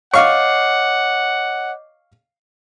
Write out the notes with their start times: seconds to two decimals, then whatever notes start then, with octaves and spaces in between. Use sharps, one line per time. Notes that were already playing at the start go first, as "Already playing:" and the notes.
0.14 C#5 D#5 F5 F#5 C#6 D6